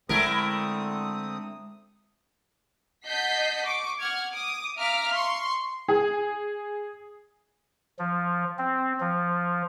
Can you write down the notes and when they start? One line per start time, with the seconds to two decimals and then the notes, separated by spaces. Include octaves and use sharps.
0.09 D3 G#3 A3 C4 E4 A#4 D#6
3.06 D#5 F#5 A5 G6 B6 C7
3.65 C#6 D6
4.00 F#5 F6 G#6
4.31 D6 D#6
4.77 E5 F5 A#5 D6 F6 B6
5.13 C6 C#6
5.88 G#4
7.99 F3
8.58 C4
9.00 F3